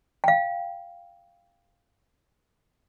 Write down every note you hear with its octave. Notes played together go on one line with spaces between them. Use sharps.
F5 G5